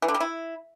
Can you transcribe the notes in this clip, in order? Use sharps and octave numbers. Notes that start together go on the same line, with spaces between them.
E3
D3
G3
E4